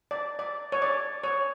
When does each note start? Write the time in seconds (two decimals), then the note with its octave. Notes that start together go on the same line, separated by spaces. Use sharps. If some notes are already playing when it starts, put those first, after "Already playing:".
0.11 D5
0.39 D5
0.72 C#5
0.82 D5
1.24 C#5